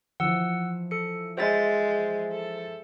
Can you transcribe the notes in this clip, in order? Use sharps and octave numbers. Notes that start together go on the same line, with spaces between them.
E3 F3 F#5 E6
A4 C#7
G#3 C5 E5 A6
A4